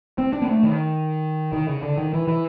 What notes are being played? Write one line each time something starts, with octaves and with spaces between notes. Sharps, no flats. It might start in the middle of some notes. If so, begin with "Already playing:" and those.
C4
D4
A#3
A3
D#3
D#3
C#3
D3
D#3
E3
E3